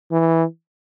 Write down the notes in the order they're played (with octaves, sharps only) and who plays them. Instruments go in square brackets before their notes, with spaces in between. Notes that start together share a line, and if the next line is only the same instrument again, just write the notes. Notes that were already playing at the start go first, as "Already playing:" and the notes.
[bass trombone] E3